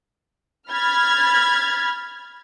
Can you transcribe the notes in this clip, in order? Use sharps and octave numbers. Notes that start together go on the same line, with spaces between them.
B5 F6 G#6 A6